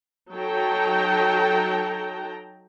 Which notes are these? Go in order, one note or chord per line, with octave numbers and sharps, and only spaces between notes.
F#3 D#4 A4 G5 A5 A#5